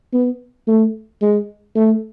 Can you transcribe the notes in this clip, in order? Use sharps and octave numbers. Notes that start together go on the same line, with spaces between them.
B3
A3
G#3
A3